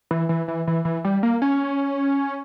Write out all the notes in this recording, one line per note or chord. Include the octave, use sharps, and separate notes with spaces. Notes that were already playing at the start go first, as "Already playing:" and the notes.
E3
E3
E3
E3
E3
G3
A#3
C#4